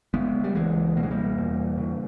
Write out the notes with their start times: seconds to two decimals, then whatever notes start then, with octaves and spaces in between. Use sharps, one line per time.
0.14 C#3 G#3 B3
0.44 G3
0.54 C#2 E3 G#3
0.97 B2 A#3
1.03 G#3
1.11 G3 A#3
1.36 E2
1.78 C#3